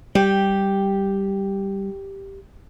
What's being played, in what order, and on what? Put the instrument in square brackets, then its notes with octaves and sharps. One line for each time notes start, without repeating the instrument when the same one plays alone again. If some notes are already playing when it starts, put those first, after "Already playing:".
[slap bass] G3 [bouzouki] G4